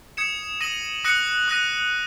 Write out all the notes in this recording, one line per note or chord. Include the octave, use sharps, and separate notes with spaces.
D#6 G#6 C#7 E7
D#6 A#6 D#7 F#7
D#6 F#6 A#6 C#7 F#7
D#6 F#6 A#6 D#7